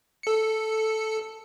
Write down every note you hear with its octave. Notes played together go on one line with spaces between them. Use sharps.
A4 C#7